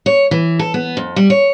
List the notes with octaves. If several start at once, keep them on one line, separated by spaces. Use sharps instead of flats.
C#5
E3
A4
B3
F2
G3
C#5